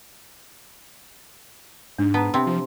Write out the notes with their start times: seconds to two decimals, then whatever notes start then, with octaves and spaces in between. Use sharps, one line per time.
1.98 G#2 D4
2.14 B3 A5 A#5
2.34 C3 C4
2.47 F3